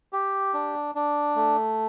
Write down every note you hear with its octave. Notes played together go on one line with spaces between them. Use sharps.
G4
D4
D4
A3